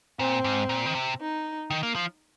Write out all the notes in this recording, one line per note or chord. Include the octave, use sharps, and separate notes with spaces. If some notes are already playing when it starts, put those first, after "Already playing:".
A#2 C4
G#2
A#2
D#3
C3
D#4
D#3
A#3
F3